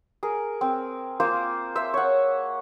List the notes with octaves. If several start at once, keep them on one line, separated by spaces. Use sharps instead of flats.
G#4 A#4
C4
A#3 F4 C5 F5
C5 E5
C#5 F#5